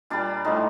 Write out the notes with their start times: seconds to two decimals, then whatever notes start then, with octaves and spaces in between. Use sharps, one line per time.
0.10 A#2 G3 D4
0.45 A2 F3 A3 D#4